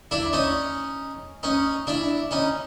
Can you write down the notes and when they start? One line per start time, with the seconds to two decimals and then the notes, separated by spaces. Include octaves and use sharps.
0.11 D4 E4
0.33 C#4 D#4
1.43 C#4 D#4
1.87 D4 E4
2.31 C#4 D#4